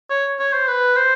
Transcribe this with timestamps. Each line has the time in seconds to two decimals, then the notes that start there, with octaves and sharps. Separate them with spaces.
0.10 C#5
0.39 C#5
0.53 C5
0.68 B4
0.96 C5